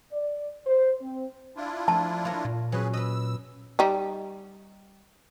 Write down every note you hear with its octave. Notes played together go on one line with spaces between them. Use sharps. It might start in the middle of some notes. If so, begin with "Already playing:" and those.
D5
C5
C4
D4 E4 F4
F3 A3 A5
A#3 A#4 C#5
A#2
F#3 C#4 G#4 B4
B4 D#5 E6
G3 D#4